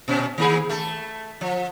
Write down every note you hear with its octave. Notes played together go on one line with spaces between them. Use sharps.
A#2 C#4
D#3 A#3 G#4
A3 A4
F3